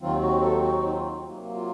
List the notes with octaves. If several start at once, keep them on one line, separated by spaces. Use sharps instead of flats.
D#2 D#3 F#3 C4 F4
F#4
A4
F#4
D#4
F4
C3 F#3 A#3
F4